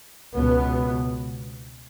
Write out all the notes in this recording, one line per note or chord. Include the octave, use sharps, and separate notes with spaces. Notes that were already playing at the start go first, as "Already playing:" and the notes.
C#2 B2 B3